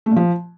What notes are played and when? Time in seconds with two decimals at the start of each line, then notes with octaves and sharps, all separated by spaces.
0.06 A3
0.11 A#2
0.16 F3